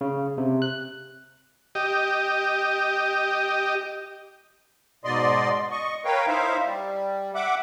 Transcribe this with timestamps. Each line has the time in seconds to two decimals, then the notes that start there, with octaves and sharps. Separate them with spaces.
0.01 C#3
0.38 C3
0.62 F#6
1.75 G4 D#5
5.04 G#2 B2 D5 D#5 C6
5.71 D#5 C#6
6.05 A#4 B4 C#5 F5 G5
6.28 D#4 E4 C5 E5 F5
6.65 G3
7.35 E5 F#5 D6